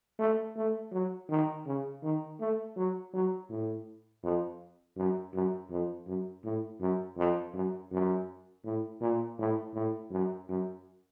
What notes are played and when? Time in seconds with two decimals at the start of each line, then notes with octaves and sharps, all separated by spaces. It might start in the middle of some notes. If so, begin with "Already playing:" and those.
0.19 A3
0.57 A3
0.93 F#3
1.30 D#3
1.67 C#3
2.03 D#3
2.40 A3
2.76 F#3
3.14 F#3
3.50 A2
4.23 F2
4.97 F#2
5.34 F#2
5.71 F2
6.07 F#2
6.44 A2
6.81 F#2
7.18 F2
7.54 F#2
7.92 F#2
8.65 A2
9.01 A#2
9.39 A2
9.75 A2
10.12 F#2
10.49 F#2